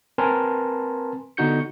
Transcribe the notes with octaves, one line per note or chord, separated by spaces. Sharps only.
C4 A#4 B4 G#5 A5 C6
D3 B3 D#4 F#4 G6 C#7